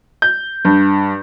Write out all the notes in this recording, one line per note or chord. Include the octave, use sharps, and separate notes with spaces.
G6
G2